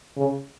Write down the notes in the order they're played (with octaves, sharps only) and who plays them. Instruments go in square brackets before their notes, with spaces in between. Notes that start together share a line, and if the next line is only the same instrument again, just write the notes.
[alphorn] C#3